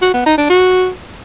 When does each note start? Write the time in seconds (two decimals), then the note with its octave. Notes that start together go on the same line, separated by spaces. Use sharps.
0.02 F#4
0.14 B3
0.26 D#4
0.38 D4
0.50 F#4